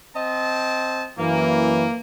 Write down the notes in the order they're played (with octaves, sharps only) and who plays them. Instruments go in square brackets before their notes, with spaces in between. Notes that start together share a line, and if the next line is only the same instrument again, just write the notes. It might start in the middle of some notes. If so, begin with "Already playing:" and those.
[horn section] C4 D#5 A5
[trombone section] F#2 E3 [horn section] A#3